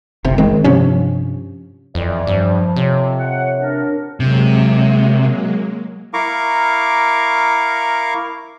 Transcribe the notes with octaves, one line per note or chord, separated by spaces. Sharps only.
F#1 C3
D#3 G#3 C4
G2 C3 F3 C#4
F2 E3 D5
G2 F3
F2 C3 F4 C#5
F#5
D4 A#4
C3 F#3 G#3 A#3
E4 A#4 F5 A#5 C#6 D6